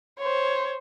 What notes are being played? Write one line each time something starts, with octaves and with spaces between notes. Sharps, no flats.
C5 C#5